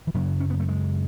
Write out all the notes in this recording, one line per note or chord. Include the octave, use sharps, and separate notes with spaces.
E3
F#2 C#3 F#3
C#4
B3
A3
G#3